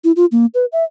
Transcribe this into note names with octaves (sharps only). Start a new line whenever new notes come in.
E4
F4
A#3
B4
E5